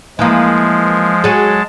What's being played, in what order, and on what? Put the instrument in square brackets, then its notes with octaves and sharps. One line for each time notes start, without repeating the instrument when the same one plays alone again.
[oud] E3 A#3 [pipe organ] F3 G#3
[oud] F#3 G#4 [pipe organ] G#3 A5